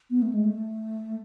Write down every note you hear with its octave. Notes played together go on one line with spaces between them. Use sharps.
B3
A3
G#3
A3